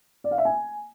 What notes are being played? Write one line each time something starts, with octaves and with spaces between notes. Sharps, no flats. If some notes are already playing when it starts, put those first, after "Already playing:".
D5
F5
E5
G#5